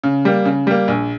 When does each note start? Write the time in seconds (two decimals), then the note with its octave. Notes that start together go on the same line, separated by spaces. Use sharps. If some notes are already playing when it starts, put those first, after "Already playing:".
0.04 C#3
0.25 G3 A#3
0.45 C#3
0.67 G3 A#3
0.88 A#1